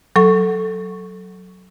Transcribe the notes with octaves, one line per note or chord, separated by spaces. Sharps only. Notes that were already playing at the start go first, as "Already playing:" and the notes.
F#3 A4 C#6